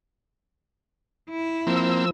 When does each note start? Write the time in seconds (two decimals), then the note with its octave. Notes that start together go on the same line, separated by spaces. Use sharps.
1.29 E4
1.67 F3 A#3 C4 E6